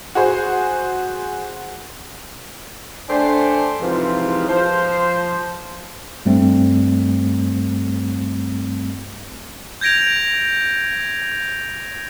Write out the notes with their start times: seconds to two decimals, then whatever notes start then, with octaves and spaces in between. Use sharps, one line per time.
0.15 F#4 G#4 C5
3.09 A3 D4 C5 D5 G5 G#5
3.81 G#2 C3 E3 F3 C4 F4
4.49 F3 C5
6.25 G2 G3 A3 C4
9.81 G6 G#6 A#6 D7 F7